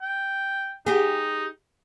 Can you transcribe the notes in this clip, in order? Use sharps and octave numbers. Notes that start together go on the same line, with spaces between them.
G5
D#4 G4 G#4